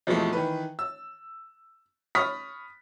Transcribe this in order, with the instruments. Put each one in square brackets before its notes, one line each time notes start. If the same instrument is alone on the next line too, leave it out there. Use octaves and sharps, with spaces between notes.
[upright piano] F2 B2 E3 F3 G#3 A3
D#3 E3 B4
E6
B5 C#6 D#6 F6 B6